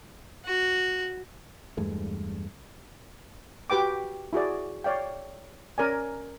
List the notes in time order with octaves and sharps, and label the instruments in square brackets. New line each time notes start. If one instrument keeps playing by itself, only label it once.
[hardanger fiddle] F#4
[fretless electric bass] E2 G2 G#3 A3
[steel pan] F#4 G4 B4 G5 D6
E4 F#4 G#4 D5
C#5 D5 F5 G5
C#4 A#4 D5 G#5